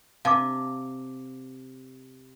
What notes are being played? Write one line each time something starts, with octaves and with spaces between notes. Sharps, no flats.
C3 F5 A5 D6